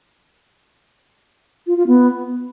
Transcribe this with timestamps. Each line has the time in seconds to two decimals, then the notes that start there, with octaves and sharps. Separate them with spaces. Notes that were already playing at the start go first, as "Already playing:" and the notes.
1.67 F4
1.77 F4
1.87 B3